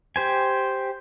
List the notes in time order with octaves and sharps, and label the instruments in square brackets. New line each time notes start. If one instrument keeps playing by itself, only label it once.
[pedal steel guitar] G4 C5 G#5